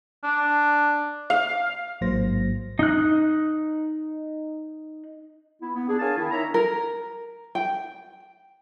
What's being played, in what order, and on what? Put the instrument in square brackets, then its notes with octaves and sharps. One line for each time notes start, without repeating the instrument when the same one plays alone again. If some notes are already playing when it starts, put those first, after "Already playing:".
[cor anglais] D4
[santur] F5
[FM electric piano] A1 G#2 F#3 A#3 C5 A#6
[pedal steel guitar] D#4 F#6
[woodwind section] B3 E4
B3
D4 G#4
G#4 A#4 C#5 F5 G#5 A5
D#3 E4
D4 D#4 A#4 C#5 E5 A#5
[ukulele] A#4
G5